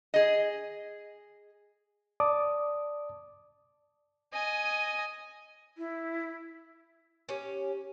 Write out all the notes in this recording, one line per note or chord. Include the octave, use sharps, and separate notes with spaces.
G#4 D#5
D5 A5 D6 D#6
D#5 G#5
E4
C#4 G4 C#5